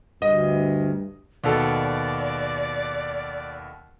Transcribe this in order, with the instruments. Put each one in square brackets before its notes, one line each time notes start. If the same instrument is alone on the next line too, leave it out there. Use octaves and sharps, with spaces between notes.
[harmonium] D2 [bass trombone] G2 [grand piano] D#5
[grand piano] D#2 B2 A4 [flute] D5